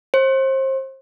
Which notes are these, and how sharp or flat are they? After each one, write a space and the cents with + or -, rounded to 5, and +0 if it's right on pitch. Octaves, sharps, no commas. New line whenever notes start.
C5 +30